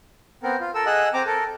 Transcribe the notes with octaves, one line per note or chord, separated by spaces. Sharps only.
B3 C4 A#4
F4
A4 A#4 E6
G#4 D#5 F#5 E6 F#6
C4 A#5 D6
A4 A#4